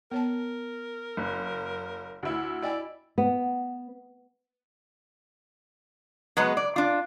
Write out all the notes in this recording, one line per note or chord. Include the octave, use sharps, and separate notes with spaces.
B3 A#4 C#5 A5
F#1
D2 E4
E4 D5 D#5 G5 G#5
B3
F#3 G#3 B3 B4
D5
D4 F4